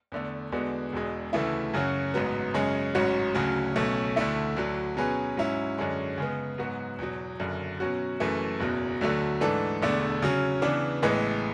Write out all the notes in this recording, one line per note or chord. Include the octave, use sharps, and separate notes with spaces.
E2 D3 A3
E2 D3 G#3 B3 F#4
E1 E2 B2 G#3
D2 C#3 E3 A3 E4
F#2 C#3 F#3 C#4 F#4
A1 G#2 F#3 B3
F#2 C#3 G#3 C#4
A1 G#2 F#3 C#4 F#4
D2 C#3 F#3 C#4
B1 B2 A3 C#4
D2 D3 A3 E4
D2 D3 F#3
B2 F#3 C#4 G#4 B4
G#2 F#3 C#4 E4
F#2 D3 G#3 C#4
C#3 G#3 B3
G#2 F#3 B3 F#4
E2 B2 F#3
F#1 F#2 D3
B2 F#3 C#4 F#4
F#1 F#2 E3 A3
F#1 E2 B2 F#3
D2 D3 F#3 A3
G#2 E3 A3 D4 A4
E1 E2 D3 A3 D4
C#3 F#3 C#4
C#3 E3 B3 D4
A1 A2 E3 G#3 B3